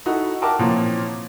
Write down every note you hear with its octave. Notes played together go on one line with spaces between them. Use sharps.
D#4 E4 F#4 A4
G4 A#4 E5 F#5 A5 D6
A#2 E3 F3 A#3 C4 C#4